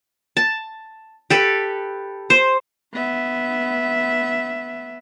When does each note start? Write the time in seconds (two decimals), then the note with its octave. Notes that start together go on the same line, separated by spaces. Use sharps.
0.37 A5
1.30 G4 A4 B4
2.30 C5
2.94 B3 E5